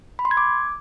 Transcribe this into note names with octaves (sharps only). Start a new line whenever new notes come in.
B5
C6
G#6
D6